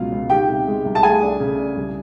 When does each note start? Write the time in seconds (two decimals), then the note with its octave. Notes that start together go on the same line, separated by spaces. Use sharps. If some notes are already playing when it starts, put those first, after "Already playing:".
Already playing: C#2 B2 F#3 F4 F5
0.12 C#2
0.30 D#3 G4 G5
0.48 C3
0.67 G#3
0.85 C2
0.95 A5
1.03 A3 G#4 G#5
1.22 D4
1.40 C#3
1.59 D4
1.76 C2